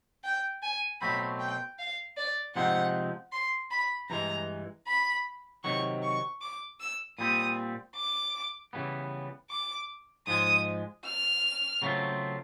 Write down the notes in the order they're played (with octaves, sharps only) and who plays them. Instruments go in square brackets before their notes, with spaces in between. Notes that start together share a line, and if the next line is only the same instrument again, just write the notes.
[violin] G5
G#5
[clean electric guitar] B2 F#3 A3 C4 [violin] B5
[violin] G5
F5
D5
[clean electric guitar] C3 F3 G#3 C4 D#4 [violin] F#5
[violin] C6
B5
[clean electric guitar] G2 E3 G#3 [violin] A#5
[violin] B5
[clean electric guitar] C3 D#3 F#3 [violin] C#6
[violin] C#6
D6
E6
[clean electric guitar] A#2 G3 C4 [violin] D#6
[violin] D6
[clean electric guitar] C#3 E3 G3 B3
[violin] D6
[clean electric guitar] G#2 F3 G#3 [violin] D#6
[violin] F6
[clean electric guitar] C#3 F#3 A3 C4 F4